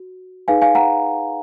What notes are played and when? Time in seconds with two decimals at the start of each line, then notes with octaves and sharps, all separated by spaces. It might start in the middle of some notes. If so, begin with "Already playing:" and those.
Already playing: F#4
0.48 D#4 G#4 B4 F5 G#5
0.62 F5 G#5
0.75 F#5 A#5